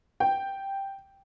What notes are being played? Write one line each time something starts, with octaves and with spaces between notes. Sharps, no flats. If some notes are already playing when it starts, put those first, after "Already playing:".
G5